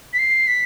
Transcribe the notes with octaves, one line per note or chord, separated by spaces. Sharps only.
B6
C7
B6